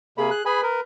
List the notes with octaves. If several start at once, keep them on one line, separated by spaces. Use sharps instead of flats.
C3 A#3 G#4 B5
F#6
G#4 B4 G#5 B5
A#4